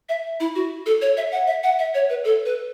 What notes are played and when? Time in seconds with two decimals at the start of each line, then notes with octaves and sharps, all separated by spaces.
0.09 E5
0.40 E4
0.55 F#4
0.86 A4
1.02 C#5
1.17 E5
1.32 F#5
1.47 E5
1.63 F#5
1.79 E5
1.94 C#5
2.10 B4
2.24 A4
2.46 B4